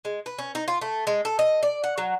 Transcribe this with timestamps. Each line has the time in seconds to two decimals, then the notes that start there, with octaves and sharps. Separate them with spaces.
0.05 G#3
0.26 B4
0.39 C#4
0.55 D#4
0.68 F4
0.81 A3
1.07 G#3
1.25 A4
1.39 D#5
1.63 D5
1.84 F#5
1.98 F#3